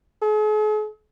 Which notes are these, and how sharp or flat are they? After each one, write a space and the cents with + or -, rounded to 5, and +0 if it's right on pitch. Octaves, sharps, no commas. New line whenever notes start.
G#4 +45